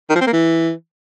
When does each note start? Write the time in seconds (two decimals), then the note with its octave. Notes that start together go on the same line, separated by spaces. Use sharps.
0.09 D#3
0.15 F3
0.21 C4
0.27 A#3
0.33 E3